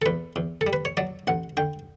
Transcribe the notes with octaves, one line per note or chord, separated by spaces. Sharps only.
A4
E2 B4
E2
A4
G3
B4
C#5
F#3 D5
A1 F#5
D3 G5